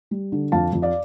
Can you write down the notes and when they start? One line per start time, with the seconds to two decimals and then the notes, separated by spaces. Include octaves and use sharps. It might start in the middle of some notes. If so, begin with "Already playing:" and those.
0.11 G3
0.32 D3
0.52 F2 F5 A5
0.73 F2
0.82 D5 F5